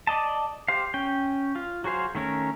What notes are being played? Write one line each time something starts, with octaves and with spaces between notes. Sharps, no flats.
D5 D#5 A5
G4 C5 F5
C#4 G5
F4
F#3 F#4 G#4 C5 F5
D#3 A3 C#4 A#4